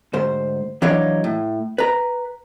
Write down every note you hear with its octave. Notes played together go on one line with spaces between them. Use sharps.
D2 G#2 C5
E3 F#3 D4 D#4 C#5 F5
A2
B4 A#5